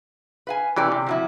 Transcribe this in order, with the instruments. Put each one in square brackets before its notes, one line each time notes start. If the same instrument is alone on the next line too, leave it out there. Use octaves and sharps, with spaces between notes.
[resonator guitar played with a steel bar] B4 F5 G#5
[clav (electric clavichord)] C3 E3 [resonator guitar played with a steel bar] C#4 G4 D5
[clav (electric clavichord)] C3
[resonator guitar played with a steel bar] F3 F#3 E4